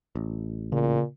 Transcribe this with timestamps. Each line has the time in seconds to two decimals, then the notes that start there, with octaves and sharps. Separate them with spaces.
0.15 A1
0.72 A#2 C#3